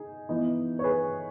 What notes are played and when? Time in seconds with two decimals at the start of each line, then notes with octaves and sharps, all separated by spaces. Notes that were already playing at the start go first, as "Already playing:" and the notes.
Already playing: D#4 G#4
0.29 E3 B3 D#4
0.79 C#5
0.84 G#4 B4